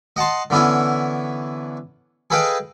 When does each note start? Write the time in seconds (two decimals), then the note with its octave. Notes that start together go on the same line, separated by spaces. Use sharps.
0.16 D#5 F#5 A5 C6
0.50 D3 E3 B3 C#4 E4
2.30 G#4 A4 B4 D#5 F5 G5